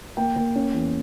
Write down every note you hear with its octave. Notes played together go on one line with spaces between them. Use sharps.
A#3 G5
A#3
C#4
E2